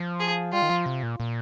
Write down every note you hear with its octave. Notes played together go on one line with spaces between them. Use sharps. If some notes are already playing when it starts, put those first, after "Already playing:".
Already playing: F3
G#4
G3 F4
D#3
F3
C3
A#2
A#2